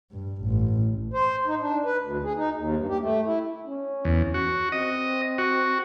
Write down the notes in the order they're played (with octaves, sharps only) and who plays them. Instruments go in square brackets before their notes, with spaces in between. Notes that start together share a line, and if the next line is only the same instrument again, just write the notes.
[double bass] G2
A1
[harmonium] C5
D#4
D4
B4
D2
G#4
D#4
D#2
G2
G4
A3
E4
[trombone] C#4
[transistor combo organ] E2
F#4
[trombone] C4 [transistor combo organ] D#5
[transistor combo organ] F#4